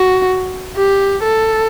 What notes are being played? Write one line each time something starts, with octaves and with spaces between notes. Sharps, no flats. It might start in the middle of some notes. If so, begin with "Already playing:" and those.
Already playing: F#4
G4
A4